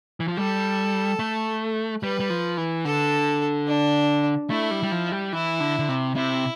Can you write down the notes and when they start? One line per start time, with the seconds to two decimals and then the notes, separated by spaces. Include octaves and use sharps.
0.20 E3
0.28 F3
0.37 G3 A4
1.19 A3
2.02 G3 B4
2.20 G3
2.30 F3
2.57 E3
2.85 D3 A4
3.67 D4
4.50 A3 E4
4.71 G3
4.83 G3
4.92 F3
5.12 G3
5.33 E3 E4
5.60 D3
5.79 D3
5.89 C3
6.15 C3 E4